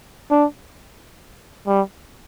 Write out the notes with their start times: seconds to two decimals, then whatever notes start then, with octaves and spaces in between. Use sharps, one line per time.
0.31 D4
1.67 G3